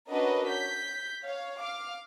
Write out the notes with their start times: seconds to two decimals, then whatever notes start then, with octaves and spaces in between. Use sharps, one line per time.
0.10 C#4 D4 F#4 A#4 B4 D#5
0.51 G6 B6
1.24 C#5 F5
1.62 F5 D6 F6